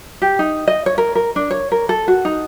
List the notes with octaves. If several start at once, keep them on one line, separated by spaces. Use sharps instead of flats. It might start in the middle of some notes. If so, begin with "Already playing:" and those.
G4
D#4
D#5
C#5
A#4
A#4
D4
C#5
A#4
A4
F#4
D#4